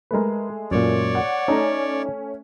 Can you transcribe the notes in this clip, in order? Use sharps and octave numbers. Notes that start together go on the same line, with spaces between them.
G#3 A3 A#4 B4
F#2 A#2 C#5 D5
F#5
A3 C#4 D#4 A5 A#5